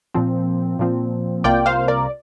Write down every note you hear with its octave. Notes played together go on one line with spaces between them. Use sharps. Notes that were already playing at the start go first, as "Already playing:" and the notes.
A#2 F3 C4
A#2 F3 C4
C2 C3 A#3 F4 D5 G5
C5 F5
A#4 D5